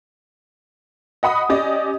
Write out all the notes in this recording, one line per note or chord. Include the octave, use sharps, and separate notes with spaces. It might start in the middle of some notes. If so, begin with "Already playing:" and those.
D#5 F#5 B5 D#6
C#4 G4 D5 D#5